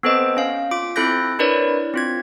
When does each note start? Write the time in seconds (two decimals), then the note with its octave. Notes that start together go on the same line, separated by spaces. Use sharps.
0.03 B3 C4 A4 B4 C5 D#5
0.37 C#4 F5
0.71 F4 D6 D7
0.96 C4 E4 A4 F#6 G6 A#6
1.39 D4 E4 A#4 B4 C#5 D5
1.94 C4 F4 G#6